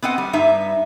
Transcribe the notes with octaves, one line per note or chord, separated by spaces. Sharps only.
B3 C4 D#5 F#5
G3
G2 D#4 E5